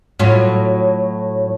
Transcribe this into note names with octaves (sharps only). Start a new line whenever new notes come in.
A2 F#3 F4